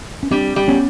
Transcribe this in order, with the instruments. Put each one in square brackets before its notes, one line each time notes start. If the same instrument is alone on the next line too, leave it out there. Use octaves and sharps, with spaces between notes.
[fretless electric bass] C#4
[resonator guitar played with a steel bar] G3 [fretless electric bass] C4 D4
[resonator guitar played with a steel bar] G3
[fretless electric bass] B3 C#4